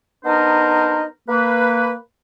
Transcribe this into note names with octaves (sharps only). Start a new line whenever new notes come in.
B3 D4 D#4 A#4 C5 D#5
A#3 B4